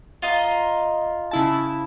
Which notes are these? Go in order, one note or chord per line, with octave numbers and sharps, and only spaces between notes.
F4 D#5 A#5
C#3 E4 A5